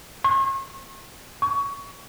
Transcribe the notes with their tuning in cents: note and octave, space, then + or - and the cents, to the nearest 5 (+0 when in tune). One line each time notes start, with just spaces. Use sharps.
C#6 -45
C#6 +20